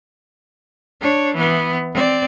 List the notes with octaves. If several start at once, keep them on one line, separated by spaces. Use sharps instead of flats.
D4 C#5
E3 B3
C4 D5